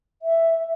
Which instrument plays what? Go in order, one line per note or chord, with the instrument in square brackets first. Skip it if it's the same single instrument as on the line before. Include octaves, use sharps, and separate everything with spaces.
[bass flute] E5